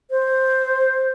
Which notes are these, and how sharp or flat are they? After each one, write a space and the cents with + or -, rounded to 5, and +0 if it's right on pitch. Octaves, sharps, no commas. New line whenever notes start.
C5 +5